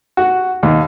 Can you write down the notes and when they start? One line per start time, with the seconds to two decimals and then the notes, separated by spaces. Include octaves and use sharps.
0.17 F#4
0.63 D#2